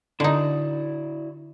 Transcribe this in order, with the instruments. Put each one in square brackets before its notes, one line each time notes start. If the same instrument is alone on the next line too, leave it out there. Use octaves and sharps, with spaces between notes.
[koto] D3 D#4 [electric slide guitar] E4 F#4 D5